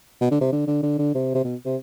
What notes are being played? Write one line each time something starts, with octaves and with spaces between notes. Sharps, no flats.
B2
D3
C3
D3
D3
D3
D3
C3
C3
B2
C3